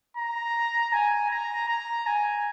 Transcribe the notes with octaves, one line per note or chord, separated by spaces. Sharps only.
A#5
G#5
A#5
A#5
G#5